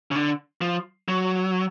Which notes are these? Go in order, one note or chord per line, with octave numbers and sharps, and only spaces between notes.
C#3
D3
F3
F#3